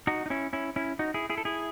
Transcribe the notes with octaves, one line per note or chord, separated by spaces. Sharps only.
D#4 F#4
D#4
C#4 E4
C#4 E4
C#4 E4
D#4 F#4
E4 G#4
E4 G#4
A4
E4 G#4